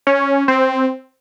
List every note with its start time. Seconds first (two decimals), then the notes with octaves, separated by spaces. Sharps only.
0.07 C#4
0.48 C4